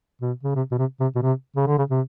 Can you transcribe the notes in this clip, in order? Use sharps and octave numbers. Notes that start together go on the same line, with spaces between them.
B2
C#3
C3
B2
C3
C3
B2
C3
C#3
D3
C#3
C3